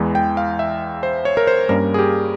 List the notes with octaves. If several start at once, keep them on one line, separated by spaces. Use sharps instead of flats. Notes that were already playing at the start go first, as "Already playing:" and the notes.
Already playing: E2 E3 G#3
G5
F5
E5
C5
C#5
A#4
C5
G2 G3 A#3 C#4 A#4
G#4
G4